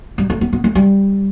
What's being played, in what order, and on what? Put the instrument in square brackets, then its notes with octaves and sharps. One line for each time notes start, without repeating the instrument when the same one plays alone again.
[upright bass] G3
A3
B3
B3
A3
G3